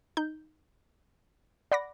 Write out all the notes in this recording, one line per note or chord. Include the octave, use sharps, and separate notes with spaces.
D#4 G6
D5 F#5 B5 D6 A#6